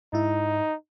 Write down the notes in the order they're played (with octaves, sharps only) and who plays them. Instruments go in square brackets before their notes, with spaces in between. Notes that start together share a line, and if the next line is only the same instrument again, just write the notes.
[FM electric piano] G#2 E4 [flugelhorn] D#4